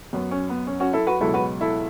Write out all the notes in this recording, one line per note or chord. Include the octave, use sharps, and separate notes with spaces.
F#2 F#3 B3
C#4
B3
C#4
C#4 F#4
E4 A4
F#4 B4
C#2 B2 F#3 E4 A4
F#4 B4
E4 A4